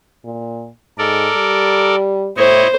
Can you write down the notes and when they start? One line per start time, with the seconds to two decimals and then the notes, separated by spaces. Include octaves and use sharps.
0.24 A#2
0.98 G#2 A4 A#4 D5
1.36 G3
2.37 A2 E4 C5 C#5 D#5